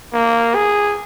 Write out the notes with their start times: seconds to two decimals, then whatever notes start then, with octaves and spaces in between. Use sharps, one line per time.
0.14 A#3
0.55 G#4